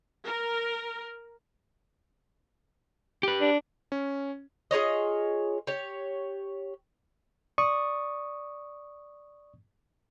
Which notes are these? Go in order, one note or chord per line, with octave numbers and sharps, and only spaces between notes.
A#4
G4 B4
D4
C#4
F4 G#4 C#5 D#5
G4 C#5
D5 C#6 D#6